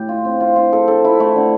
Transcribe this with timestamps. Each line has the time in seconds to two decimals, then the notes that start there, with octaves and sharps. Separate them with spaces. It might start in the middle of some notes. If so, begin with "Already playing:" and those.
Already playing: A2 G4
0.09 F4
0.25 C4
0.40 F4
0.56 F4
0.73 A4
0.88 A4
1.04 E4
1.20 A3
1.36 D3